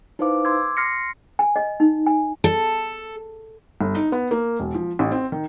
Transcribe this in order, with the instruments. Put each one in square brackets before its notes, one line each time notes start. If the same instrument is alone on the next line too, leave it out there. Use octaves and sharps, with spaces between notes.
[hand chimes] D#4 E4 B4 C5 F5 D6
C6 D6 E6 G#6
C6 F6 A#6 C7 C#7
[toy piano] G#5
D#5
D#4
G#5
[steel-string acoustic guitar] A4
[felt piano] G1
D#4
B3
A#3
E1
F3
A1
C4
D#3